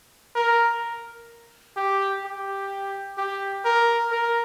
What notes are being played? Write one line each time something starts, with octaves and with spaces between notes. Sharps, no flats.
A#4
G4
G4
G4
A#4
A#4